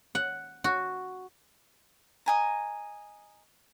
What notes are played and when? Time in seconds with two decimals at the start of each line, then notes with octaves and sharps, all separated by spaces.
0.15 F#5
0.64 F#4
2.26 D#5 G#5 A#5